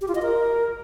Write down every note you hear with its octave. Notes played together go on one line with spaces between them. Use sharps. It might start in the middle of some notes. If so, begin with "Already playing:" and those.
G4
F4
D#5
A#4